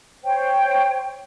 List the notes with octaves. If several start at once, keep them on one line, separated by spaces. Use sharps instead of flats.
C5 C#5 G5